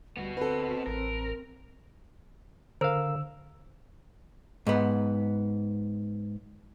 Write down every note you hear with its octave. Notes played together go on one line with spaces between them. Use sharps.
D2 G3 B3 F#4
C4 A4 B4
A1 A#4
D3 A#4 C5 F5 E6
G#2 B3